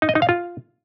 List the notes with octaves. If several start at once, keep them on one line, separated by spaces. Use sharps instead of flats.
D#4
D#5
D#4
F5
F4